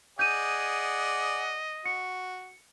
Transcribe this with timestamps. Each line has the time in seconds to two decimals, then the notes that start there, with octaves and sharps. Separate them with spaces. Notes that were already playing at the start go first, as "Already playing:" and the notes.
0.19 G#4 D5 D#5 F#5 G6 D#7
1.86 F#4 C#7